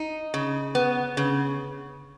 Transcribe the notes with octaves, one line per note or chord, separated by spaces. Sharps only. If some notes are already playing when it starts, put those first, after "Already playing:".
Already playing: D#4
C#3
B3
C#3